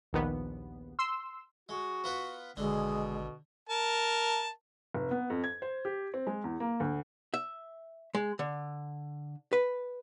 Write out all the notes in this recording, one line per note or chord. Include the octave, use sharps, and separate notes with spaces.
A#1 D#2 B3
C6 E6
G#3 F#4
B3 F4 B4
G#1 B2 D3 G#3
A#4 A5
F1
B3
F2
G#6
C5
G4
C4
G#3
E2
A#3
D2
E5
G#3
D3
B4